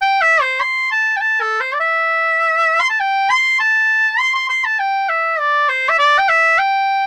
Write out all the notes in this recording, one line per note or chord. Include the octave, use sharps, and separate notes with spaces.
G5
E5
C5
C6
A5
G5
A5
A4
C5
D5
E5
C6
A5
G5
C6
A5
C6
C6
C6
A5
G5
E5
D5
C5
E5
D5
G5
E5
G5